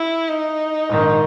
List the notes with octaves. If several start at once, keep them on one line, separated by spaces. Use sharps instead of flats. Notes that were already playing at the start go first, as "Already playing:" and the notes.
Already playing: E4
D#4
A#1 G#2 D#3